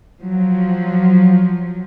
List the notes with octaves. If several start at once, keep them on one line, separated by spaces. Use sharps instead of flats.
F3 F#3